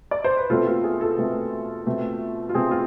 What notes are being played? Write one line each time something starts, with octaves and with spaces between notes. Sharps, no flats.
D5
C5
B4
B2 A3 C4 F4 A4
F4
G#4
F4 A4
B2 A3 C4
B2 A3 C4
F4
B2 A3 C4 G#4
F4